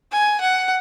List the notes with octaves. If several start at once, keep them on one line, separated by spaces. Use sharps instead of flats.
G#5
F#5